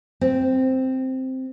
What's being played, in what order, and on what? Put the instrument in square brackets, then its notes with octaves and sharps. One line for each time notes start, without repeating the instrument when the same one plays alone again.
[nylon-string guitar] C4